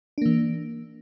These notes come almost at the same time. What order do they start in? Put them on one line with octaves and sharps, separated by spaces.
D4 A#3 E3